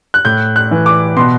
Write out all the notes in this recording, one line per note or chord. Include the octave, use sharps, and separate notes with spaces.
F#6
A2 G6
F#6
E3
D6
B2 C6